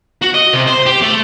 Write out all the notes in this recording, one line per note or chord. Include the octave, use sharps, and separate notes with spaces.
F#4
D#5
C3
C5
G4
A3